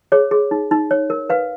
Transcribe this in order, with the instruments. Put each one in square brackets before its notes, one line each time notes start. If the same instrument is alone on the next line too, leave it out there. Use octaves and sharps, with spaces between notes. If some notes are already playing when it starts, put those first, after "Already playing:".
[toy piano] G#4 C#5
G#4
D#4
D#4
C#5
A#4
B4 F5